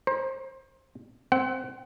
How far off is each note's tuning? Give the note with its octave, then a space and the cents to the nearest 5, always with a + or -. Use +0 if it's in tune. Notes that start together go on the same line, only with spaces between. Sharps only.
C5 +25 A#5 +40
C4 +0 F#5 +35